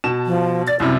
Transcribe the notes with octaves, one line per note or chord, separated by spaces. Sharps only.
B2 A5 E7
F3
D5 A6
C2 F#2 C3 E4